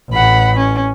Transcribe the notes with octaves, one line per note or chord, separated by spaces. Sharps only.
A1 F#5 B5
C#4